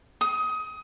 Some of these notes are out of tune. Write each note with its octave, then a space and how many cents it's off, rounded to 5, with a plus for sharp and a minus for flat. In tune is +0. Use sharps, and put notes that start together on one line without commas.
D#6 +25